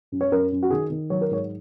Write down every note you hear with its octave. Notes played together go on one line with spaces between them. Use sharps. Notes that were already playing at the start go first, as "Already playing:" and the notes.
F#2
C#5
F#2 A#4
F#2
F#4
D#3 G#4
D#3
F#3 C#5
A#4
G#2 C#5